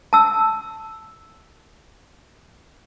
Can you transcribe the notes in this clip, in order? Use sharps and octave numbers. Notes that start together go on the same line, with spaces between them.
A5 E6